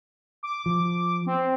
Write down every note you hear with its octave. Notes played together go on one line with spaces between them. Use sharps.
D6
F3
C4